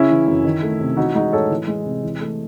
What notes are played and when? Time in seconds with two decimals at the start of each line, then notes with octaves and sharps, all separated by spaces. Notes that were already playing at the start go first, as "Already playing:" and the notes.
Already playing: C#3 C#4 E4
0.10 E3
0.27 F#2
0.44 D#3
0.62 A3
0.80 C3
0.97 E3 D#4 F#4
1.15 G#3 D#4 F#4
1.33 A2 A4 C#5
1.50 E3
1.68 G#3
1.85 C3
2.03 E3
2.20 A3